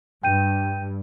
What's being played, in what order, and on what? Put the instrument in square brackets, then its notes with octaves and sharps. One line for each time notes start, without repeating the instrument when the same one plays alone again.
[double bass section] G2 [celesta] G5 G6 D#7